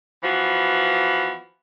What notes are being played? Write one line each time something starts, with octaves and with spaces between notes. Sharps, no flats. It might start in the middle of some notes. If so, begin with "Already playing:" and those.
E3 F3 B3 F#4